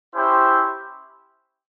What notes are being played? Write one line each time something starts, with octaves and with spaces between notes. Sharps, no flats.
C#4 E4 G4 C5